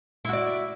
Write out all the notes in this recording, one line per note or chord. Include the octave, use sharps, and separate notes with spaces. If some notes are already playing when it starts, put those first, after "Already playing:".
E4 F#4 D5